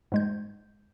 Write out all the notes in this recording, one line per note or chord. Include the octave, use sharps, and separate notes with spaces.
G#2 G#3 G6